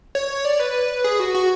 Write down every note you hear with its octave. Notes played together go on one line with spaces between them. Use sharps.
C#5
D5
B4
G#4
F#4
F#4